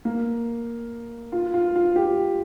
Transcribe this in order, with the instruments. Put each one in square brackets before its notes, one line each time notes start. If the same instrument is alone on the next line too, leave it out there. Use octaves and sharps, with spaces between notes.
[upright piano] A#3
F4
F4
F4
G4